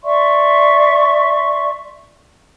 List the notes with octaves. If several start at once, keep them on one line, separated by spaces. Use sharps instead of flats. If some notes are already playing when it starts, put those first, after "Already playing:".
D5 E5 C6 C#6